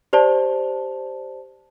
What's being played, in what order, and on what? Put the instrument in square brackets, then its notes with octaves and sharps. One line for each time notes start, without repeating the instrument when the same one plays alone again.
[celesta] G4 C5 D5 A5